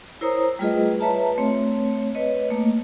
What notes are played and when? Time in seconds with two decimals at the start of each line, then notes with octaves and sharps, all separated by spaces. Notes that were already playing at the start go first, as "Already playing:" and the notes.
0.21 E4 A#4 C5 C#5 A#5 D#6
0.59 G3 A3 F4 G#4 B4 D#5
1.00 B4 C#5 E5 A5 A#5
1.38 A3 C4 C#5
2.15 B4 C#5 D#5
2.50 A3 A#3